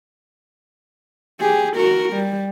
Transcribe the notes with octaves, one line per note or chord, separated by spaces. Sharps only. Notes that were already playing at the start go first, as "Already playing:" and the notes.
G4 G#4
F#4 A#4
G3